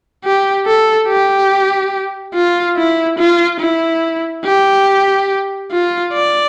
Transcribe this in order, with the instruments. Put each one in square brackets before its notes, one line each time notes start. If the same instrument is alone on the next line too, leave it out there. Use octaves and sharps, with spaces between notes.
[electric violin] G4
A4
G4
F4
E4
F4
E4
G4
F4
D5